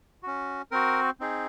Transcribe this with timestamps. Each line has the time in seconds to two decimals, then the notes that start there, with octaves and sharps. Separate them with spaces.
0.23 C#4 F#4
0.71 C4 F#4 A#4
1.20 C4 D#4 G#4